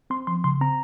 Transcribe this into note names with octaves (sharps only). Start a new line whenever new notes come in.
C4 C6
F3 C6
C#3 C6
C4 A#5